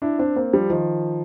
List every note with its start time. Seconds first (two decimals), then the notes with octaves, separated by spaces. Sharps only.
0.02 D4 E4
0.19 C4 D4
0.36 A#3 C4
0.53 F3 G3
0.70 D#3 F3